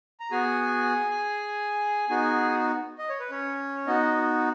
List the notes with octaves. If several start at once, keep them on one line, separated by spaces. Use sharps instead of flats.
A#5
B3 F#4 G#4 G#5
B3 D#4 F#4 G#4 G#5
D#5
C#5
B4
C#4 C#5
B3 D#4 F#4 D#5